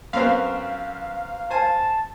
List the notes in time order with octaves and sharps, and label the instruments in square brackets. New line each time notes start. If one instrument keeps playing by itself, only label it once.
[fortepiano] F#2 B3 C4 [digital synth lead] F5
[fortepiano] C5 G#5 [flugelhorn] A5